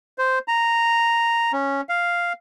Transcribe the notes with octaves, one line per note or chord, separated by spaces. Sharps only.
C5
A#5
C#4
F5